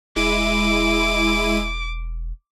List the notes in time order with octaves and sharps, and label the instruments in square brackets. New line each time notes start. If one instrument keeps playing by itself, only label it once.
[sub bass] E1 [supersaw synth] G#3 E4 D#7 [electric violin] D6